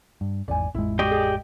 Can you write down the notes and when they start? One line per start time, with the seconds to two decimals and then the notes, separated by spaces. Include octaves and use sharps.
0.21 G2
0.48 G#1 E2 G#2 D5 G#5
0.75 A1 F2 G#3 E4
0.99 F#4 G4 D5 D#5
1.11 G#4